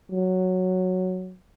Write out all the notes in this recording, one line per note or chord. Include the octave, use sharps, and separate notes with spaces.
F#3